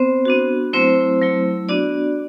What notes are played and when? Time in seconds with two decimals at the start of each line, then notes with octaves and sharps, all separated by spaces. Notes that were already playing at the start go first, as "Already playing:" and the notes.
Already playing: B3 C4 C5
0.25 B3 D4 F#4
0.73 F#3 A3 C4 E4 C5
1.21 F#3 A3 E4
1.69 B3 D4 F#4 D5